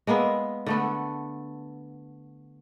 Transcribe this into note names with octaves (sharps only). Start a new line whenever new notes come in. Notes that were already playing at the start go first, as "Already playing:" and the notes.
G#3 A#3 B3 E5
D3 A3 B3